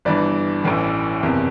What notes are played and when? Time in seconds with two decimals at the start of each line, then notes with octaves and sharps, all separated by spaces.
0.05 G1 G2 E3 D5
0.64 A1 A2 E3
1.22 F#1 E2 C3